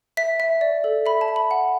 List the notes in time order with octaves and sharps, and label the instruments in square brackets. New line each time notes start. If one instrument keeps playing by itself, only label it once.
[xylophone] E5 B6
E5
D5
A4
E5 B5
A5
E5
B5
F#5